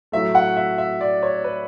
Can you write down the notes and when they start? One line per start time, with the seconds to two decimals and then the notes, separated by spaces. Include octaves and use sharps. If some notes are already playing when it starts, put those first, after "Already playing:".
0.12 A2 F#3 A3 E5
0.35 F#5
0.57 E5
0.78 E5
1.01 D5
1.23 C#5
1.44 B4